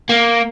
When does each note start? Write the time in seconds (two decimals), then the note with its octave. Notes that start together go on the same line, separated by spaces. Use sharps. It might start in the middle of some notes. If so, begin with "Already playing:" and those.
0.09 A#3